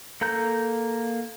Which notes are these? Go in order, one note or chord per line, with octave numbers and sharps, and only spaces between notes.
A#3 A4 A#5 G6